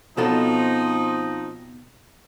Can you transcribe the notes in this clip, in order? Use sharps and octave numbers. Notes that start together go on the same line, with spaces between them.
B2 F3 C4 D#4 F#4 A4